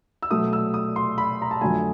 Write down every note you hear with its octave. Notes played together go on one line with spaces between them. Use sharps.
E6
B2 F#3 A3 D#6
E6
D#6
C6
B5
A#5
A5
F2 D3 F#3 A3 G#5